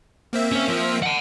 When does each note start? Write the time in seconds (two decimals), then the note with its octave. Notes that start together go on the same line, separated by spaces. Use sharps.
0.33 A#3 C4 E5
0.52 C#4 C#5
0.68 F3
1.02 F#5 A5